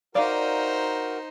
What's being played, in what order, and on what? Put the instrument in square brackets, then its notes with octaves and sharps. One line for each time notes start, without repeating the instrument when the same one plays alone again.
[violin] D#4 C5 [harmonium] F#4 A#4 [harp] D5 F5